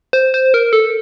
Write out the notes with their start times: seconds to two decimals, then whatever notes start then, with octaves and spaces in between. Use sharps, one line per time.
0.13 C5
0.34 C5
0.54 A#4
0.73 A4